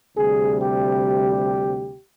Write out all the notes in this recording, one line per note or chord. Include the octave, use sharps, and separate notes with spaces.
D2 C3 G3 G#4
G4